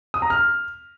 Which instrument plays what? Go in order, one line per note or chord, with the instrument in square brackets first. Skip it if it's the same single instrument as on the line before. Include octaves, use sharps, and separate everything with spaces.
[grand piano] D#6
A#5
F6